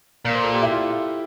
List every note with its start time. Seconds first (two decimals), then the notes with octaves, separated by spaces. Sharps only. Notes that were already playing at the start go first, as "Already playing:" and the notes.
0.25 A#2 A#4
0.34 C5
0.43 A4
0.54 G4
0.62 E4
0.71 F4